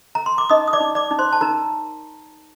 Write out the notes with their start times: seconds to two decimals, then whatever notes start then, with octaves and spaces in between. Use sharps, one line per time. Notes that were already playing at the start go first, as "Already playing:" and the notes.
0.15 A#5
0.26 C6
0.38 D6
0.49 D#4 D#5 D#6
0.67 D#6
0.73 D5 D6
0.80 D#4
0.95 D5 D6
1.11 D#4
1.19 C5 C6
1.33 A5
1.41 D#4 A#4 A#5